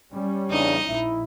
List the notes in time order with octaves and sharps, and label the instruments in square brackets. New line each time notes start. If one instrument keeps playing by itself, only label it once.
[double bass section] G3 C#4
[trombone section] E2 C#3 D4 [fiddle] D#4 D#5
[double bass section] A#1 [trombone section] E4